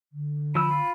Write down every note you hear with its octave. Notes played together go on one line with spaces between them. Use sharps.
D3
F3 B5 E6
F4